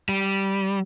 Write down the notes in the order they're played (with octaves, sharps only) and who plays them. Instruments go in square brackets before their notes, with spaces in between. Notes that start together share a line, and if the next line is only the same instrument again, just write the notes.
[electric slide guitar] G3